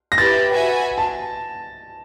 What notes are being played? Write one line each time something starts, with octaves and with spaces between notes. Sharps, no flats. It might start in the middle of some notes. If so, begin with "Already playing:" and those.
A#6
E4 G4 B4 A6
F#4 B4 E5 G#5
A5